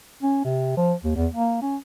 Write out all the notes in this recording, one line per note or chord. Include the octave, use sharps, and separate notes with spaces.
C#4
C3
F3
D#2
E2
A#3
C#4